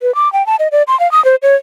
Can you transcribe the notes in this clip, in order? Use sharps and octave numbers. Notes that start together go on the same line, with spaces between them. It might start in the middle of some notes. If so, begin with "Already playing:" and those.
B4
D6
G5
A5
D#5
D5
C6
F5
D#6
C5
C#5